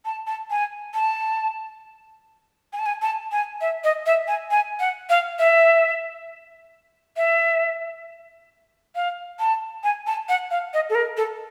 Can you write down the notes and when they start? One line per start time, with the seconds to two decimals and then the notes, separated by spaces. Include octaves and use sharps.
0.05 A5
0.27 A5
0.50 G#5
0.94 A5
2.73 G#5
2.79 A5
2.86 G#5
3.02 A5
3.32 G#5
3.61 E5
3.84 D#5
4.06 E5
4.28 G#5
4.51 G#5
4.80 F#5
5.10 F5
5.39 E5
7.17 E5
8.95 F5
9.40 A5
9.84 G#5
10.07 A5
10.29 F#5
10.51 F5
10.74 D#5
10.90 A4
10.95 A#4
11.17 A4